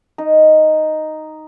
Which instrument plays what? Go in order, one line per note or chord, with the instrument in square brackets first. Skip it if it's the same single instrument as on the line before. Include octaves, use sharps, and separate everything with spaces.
[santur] D#4